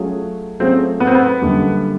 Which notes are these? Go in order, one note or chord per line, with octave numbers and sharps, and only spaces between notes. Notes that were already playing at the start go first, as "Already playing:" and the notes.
Already playing: F#3 A3 C#4 F4 G#4
F#3 A3 C4 C#4 F4 G#4
B3
C4
B3
F#2 D3 G3 A#3